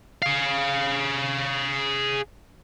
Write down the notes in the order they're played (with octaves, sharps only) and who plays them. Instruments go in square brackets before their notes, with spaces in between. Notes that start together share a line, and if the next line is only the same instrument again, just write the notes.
[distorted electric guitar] G#4 F5